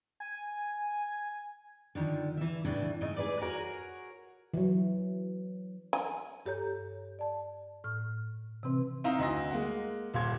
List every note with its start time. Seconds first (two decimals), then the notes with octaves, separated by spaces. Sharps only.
0.20 G#5
1.95 D3 D#3 F3
2.37 E3 E5
2.65 A2 C#3 E3 D4
3.01 G#2 A3 D#5
3.16 G#4 B4 D5
3.41 F#4 G#4 A#4 C#5 F#5
4.54 E3 F#3
5.93 G#5
6.46 G2 G4 A4 C#5 A#5 G6
7.19 D5 A5
7.84 A2 F6
8.63 C3 E3 C4 B4
9.04 C4 D#4 E4 E5 F5 A#5
9.19 D2 D#5 C6 A#6
9.51 G#3 A#3 F#5
10.14 D#1 A#2 F5 C6 G#6